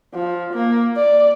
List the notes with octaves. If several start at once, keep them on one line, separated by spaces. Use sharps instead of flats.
F3
A#3
D5